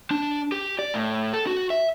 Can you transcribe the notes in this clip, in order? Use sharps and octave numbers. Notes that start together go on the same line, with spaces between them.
D4
G4
D5
A2
A4
F#4
E5